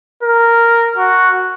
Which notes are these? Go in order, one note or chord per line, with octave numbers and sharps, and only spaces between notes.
A#4
F#4